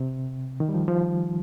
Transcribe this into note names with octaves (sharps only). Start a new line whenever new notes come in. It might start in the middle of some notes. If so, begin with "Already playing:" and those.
Already playing: C3
D#3
G3
F3
F3